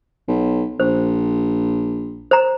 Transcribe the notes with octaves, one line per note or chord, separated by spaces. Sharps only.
B1
A#1 C5
C5 A#5